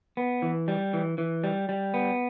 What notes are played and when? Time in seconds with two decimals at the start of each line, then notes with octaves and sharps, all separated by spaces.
0.17 B3
0.42 E3
0.68 G3
0.93 E3
1.18 E3
1.44 G3
1.69 G3
1.94 B3